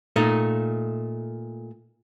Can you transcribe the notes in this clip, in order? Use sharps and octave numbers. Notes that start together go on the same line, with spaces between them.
A#2 A3 D#4